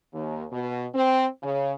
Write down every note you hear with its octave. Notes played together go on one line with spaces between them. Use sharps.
D#2
B2
C4
C#3